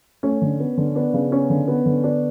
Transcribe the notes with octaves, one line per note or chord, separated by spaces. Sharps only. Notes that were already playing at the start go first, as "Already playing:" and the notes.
A3 C#4
D3
B3
D3
B3 D4
C#3
B3 C#4
D3
B3
D3
B3 D4